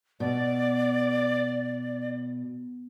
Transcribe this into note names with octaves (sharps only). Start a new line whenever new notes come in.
B2 D5